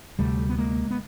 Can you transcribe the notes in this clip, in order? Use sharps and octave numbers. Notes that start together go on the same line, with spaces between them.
D2 C3 G3 A3
B3
G#3 A#3
B3